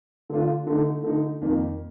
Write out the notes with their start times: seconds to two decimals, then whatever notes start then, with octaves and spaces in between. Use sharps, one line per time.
0.29 D3 A3 D4 F4
0.67 D3 A3 D#4
1.04 D3 A3 D#4
1.41 F2 D#3 A#3